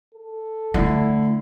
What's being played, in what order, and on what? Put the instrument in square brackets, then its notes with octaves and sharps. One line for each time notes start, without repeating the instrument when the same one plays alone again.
[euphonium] A4
[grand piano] D3 E4 [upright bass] A3